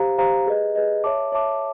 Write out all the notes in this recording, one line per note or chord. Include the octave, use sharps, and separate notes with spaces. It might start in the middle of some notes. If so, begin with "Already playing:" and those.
Already playing: G4 C5 F5 A#5
G4 C5 F5 A#5
G#4 B4 D#5
G#4 B4 D#5
C#5 E5 A5 D6
C#5 E5 A5 D6